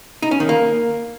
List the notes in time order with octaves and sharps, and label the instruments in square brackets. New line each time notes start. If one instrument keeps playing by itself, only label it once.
[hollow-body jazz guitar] D#4
C#4
D#3
A#3